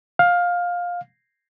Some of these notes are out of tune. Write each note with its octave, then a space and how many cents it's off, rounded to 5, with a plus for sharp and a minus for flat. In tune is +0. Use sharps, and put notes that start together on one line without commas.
F5 +15